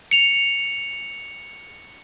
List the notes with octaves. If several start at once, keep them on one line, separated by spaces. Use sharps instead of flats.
C#7 F7